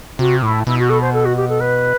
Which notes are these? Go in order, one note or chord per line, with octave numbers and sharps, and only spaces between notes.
C3 F#4
A2 E4
B2 E4
F#4
A4
C5
A4
F#4
G4
A4
B4